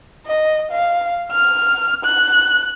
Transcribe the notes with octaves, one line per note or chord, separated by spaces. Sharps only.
D#5
F5
F6
F#6